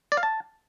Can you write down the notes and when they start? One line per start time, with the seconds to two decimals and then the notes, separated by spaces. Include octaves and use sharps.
0.12 D5
0.17 F5
0.23 A5